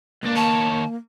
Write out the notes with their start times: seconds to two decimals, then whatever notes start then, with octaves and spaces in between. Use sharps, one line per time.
0.23 C#2 A#3 D4
0.36 D#3 C#5 A5